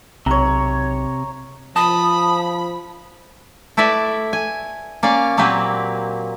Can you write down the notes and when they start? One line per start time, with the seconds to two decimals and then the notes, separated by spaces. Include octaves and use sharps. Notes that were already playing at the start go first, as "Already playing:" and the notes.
0.26 B1 C3 C#5 A#5
1.76 F3 A5 B5 D#6
3.77 A3 E4 B4 D5 E5
4.33 G#5
5.03 A#3 C#4 D5 F5
5.37 A#2 F#3 A#3 C4 G4 B4